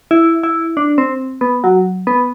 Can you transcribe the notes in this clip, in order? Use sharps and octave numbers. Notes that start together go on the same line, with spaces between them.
E4
E4
D4
C4
B3
F#3
B3